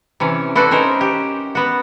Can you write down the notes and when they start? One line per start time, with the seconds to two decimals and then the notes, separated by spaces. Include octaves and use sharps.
0.20 C3 E3 C#4
0.55 E4 F#4 A4 B4 C5 D5
0.71 C#4 D#4 A#4 C5
1.01 G4
1.55 B3 F#4